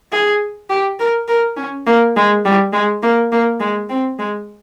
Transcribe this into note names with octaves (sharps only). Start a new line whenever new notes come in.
G#4
G4
A#4
A#4
C#4
A#3
G#3
G3
G#3
A#3
A#3
G#3
C4
G#3